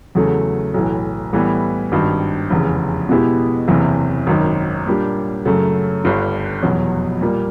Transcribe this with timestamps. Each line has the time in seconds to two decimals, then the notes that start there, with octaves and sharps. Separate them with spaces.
0.15 E2 C#3 F#3 A3
0.74 B1 A2 E3
1.33 A2 E3 G3 B3
1.92 G#1 G2 D#3
2.50 F1 E2 C#3 E3
3.09 B2 G#3 B3 E4 G4
3.68 F#1 E2 C3 E3
4.27 G#1 F#2 D#3
4.86 A#2 G3 A#3 D4 G4
5.45 F#2 C#3 F#3 A3
6.04 G1 G2 D3
6.63 F1 E2 B2 F#3
7.21 A#2 G3 A#3